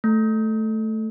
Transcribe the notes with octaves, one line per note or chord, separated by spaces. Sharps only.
A3